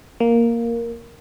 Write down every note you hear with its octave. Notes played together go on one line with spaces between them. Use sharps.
A#3